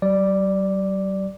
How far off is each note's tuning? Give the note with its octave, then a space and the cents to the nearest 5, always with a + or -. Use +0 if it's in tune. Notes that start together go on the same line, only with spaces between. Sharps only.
G3 -45 D5 +0